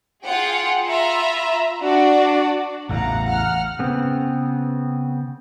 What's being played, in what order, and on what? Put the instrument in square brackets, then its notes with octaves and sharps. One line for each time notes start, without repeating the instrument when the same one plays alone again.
[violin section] F4 G#4 F#5 G5
F4 E5 A#5 B5
D4 F#4 D5
[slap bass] A1 E2 C#3 [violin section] F5 F#5 A#5
[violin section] F#5 F6
[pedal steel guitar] C#3 B3 C4